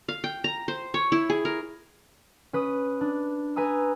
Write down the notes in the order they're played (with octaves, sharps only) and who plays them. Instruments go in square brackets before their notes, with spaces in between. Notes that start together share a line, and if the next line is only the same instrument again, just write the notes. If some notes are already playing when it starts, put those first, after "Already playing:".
[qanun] F5
G5
A#5
C5
C#5
E4
G#4
A#4
[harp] C#4 B4 D#6
D4
B4 G#5 A#5 D#6 E6